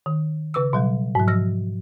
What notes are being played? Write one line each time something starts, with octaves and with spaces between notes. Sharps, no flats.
D#3
C#3 B4 D6 E6
B2 F#3 G3
G#2 F#3
F3 E6 A#6